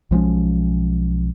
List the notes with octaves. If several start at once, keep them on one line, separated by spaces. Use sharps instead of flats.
B1 F3 G#3 C#4